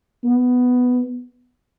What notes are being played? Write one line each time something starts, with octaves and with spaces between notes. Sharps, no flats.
B3